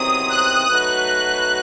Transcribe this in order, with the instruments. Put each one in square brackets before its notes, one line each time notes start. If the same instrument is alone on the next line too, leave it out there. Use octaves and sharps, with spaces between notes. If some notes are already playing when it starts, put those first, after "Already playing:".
Already playing: [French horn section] E2 C3 D#3 F#3 C4 [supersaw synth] D#6
[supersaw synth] F#6
[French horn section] F#3 A3 D#4 F#4 B4 [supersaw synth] F#6